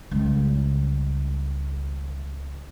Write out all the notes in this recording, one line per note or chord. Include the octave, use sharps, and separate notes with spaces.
C#2 G3